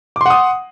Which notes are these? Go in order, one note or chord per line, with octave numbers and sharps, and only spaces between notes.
F#5 C6 D6 D#6